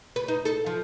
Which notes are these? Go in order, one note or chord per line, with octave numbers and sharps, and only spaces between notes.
B4
D#4
A4
F3